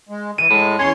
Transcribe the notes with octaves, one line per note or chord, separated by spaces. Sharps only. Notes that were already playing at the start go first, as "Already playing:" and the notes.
G#3
E3 D#7
A2 G#3
E2 C#4 C#5 C6